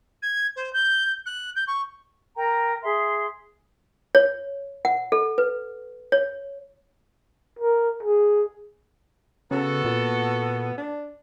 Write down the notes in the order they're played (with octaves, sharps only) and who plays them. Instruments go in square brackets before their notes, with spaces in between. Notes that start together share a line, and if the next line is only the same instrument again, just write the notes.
[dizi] G#6
C5
G6
F#6
G6
C#6
[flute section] A#4 G5 A#5
G#4 E5 C6
[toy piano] C#5
F#5
A4
B4
C#5
[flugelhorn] A#4
G#4
[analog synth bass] C#3 [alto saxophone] B3 [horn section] F#4 A4
[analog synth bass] A#2
[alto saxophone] D4